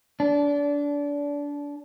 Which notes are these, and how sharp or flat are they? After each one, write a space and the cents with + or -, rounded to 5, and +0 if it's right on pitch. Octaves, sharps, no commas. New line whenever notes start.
D4 -25